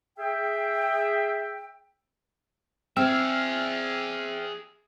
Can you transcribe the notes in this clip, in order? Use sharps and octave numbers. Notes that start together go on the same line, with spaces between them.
G#4 E5 G5
C4 G#4 E5 G5 E6 F6